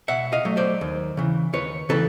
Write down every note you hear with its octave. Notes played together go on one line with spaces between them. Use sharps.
B2 E5 F#5
D#5 F5
F#3 A3
C5 D5
D#2
C#3 E3
D#2 B4 C#5
C#3 E3 A4 B4